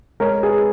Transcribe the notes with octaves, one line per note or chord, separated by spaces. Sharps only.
G#3 A#4 C#5
G#4 B4